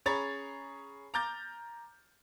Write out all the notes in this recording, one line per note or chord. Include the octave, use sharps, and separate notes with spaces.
C#4 G#4 C#5 A#5 B5 A6
A#5 D6 F6 G6 A6